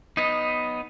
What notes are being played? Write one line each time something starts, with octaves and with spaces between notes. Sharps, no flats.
B3 D#4